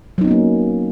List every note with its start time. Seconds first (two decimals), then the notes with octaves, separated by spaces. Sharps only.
0.18 F#3
0.21 D#4
0.24 B3
0.28 C#4
0.31 A#3